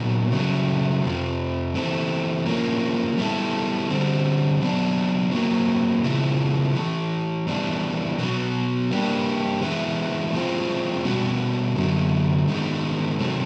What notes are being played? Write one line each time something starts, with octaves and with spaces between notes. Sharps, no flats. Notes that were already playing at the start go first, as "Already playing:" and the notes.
Already playing: A#2 F#3 B3 D#4 F#4
C#3 F#3 A3
F2 C3 F3
E3 A3 C4
A2 F3 A#3 C#4
G3 B3 E4 A4
D3 G3 C4
F#3 B3 D4
A2 F#3 A#3
C#3 F3 G#3 B3 E4
A2 E3 A3
A2 E3 G3 B3 D4
B2 F#3 B3
G3 A#3 D4 G4
A2 E3 G#3 B3 E4
A2 F3 G#3 C4 F4
B2 G3 B3 D4 F#4
F#2 D3 F#3 A3
G#2 D#3 G#3 B3 D#4
C3 D#3 F#3 A3